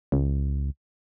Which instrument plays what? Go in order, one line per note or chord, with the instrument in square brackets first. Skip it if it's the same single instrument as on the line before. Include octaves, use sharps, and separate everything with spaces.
[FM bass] C#2